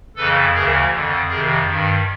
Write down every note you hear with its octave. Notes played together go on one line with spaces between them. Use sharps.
F2 C#3 E3 A4 B4
D2 C#3 E3 G#4 A#4
F2 D3
F2 C3 D#3 G#4 A#4
G2 D#3